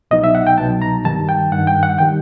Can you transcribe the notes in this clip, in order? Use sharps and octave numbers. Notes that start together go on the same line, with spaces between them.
C2 B2 F#3 B3 D#4 D#5
E5
F#5
G5
C2 B2 F#3 B3 D#4 A5
A#5
G2 D#3 G3 A5
G5
G2 D#3 G3 F#5
G5
F#5
D#3 G3 G5